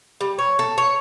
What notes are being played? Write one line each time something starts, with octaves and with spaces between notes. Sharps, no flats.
G3
C#5
A4
C#5